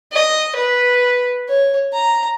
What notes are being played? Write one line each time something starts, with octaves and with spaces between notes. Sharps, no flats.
D#5
B4
C#5
A#5